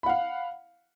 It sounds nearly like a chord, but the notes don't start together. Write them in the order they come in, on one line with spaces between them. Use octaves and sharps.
B5 F#5 F5